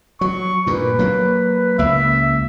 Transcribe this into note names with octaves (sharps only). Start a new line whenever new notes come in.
F#3 C#6
G2 A#2 B4
F#3 A#3
C#2 A#3 E5